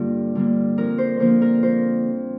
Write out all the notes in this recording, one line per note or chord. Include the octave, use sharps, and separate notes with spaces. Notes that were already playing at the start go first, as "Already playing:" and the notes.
Already playing: G2 D3 G3 A#3 F4
D3 G3 A#3
F2 A#4
C5
D3 F3 A#3 C5
A#4
F2 C5